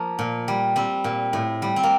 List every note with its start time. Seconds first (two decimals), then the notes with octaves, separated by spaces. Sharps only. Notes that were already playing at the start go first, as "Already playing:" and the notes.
Already playing: F3 A#3
0.19 A#2
0.48 G3
0.76 G3 C4
1.04 A#2
1.33 A2
1.62 G3
1.76 C4
1.83 A#3